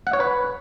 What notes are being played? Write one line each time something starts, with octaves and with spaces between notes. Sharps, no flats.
F#5
C#5
B4